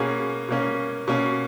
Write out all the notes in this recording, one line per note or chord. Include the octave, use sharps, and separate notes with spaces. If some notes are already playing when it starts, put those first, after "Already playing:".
Already playing: B2 A#3 C#4 G#4
B2 A#3 C#4
B2 A#3 C#4